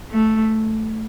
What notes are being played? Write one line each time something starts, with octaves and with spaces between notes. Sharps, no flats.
A3